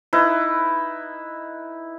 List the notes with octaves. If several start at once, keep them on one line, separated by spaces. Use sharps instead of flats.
D#4 E4 B4